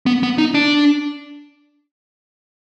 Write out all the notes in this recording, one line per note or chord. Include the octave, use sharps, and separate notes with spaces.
B3
B3
D#4
D4